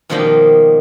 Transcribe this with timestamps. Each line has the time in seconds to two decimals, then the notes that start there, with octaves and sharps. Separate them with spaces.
0.10 B2 D#3 F3 G3 A#3 D#4